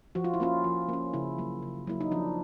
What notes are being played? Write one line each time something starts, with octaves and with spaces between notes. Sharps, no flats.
F3 F#4
F4
E4
A#3 C#4 F4
F3
A#3 C#4
C#3 E4
F#3 A#3
C#3
F#3 A#3 E4
D#4
F3 D4